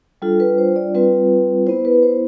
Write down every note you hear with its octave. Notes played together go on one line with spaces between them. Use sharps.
G3 D4 F4 A4
B4
C5
D5
G3 C4 F4 B4
B3 E4 C5
B4
C5